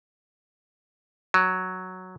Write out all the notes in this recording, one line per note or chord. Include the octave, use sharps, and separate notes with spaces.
F#3